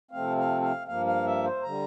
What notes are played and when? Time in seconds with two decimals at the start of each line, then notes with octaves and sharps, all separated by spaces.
0.11 C3 F3 A3 C4 F5
0.37 F5
0.62 F5
0.87 G2 F3 A#3 F5
1.06 F5
1.25 E5
1.44 C5
1.63 D3 G3 A#5